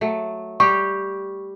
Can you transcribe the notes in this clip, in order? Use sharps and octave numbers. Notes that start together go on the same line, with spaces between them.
F#3 A3
G3 G4 C#6